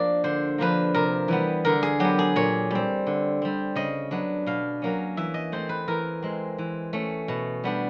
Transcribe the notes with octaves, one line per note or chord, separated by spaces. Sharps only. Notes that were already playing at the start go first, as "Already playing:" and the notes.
Already playing: F3 A#3 D4 D5
D3 C5
F3 A#3 D4 B4
C3 A#4
E3 G3 B3
D3 A#4
G#4
F#3 B3 G4
G#4
A#2 C#5
G3 C4
D3
G3 C4
C#3 D#5
F#3 B3 D4
B2 F5
F#3 A#3 C#4
E3 E5
D#5
A3 C4 C5
B4
E3 A#4
G#3 C4
E3
A3 C#4
B2
G3 B3 D4